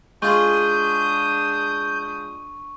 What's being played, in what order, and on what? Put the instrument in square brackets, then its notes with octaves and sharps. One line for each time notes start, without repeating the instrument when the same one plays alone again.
[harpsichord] G#3 F4 G#4 [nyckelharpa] D4 D#6 [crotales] C#6 [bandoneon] G6